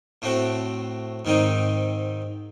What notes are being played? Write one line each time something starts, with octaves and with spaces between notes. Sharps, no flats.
A2 A3 C4 F#4
G#2 D#3 C4 D#4